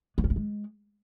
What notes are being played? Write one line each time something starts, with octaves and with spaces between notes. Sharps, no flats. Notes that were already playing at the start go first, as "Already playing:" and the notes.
B3
C#4
A#3
G#3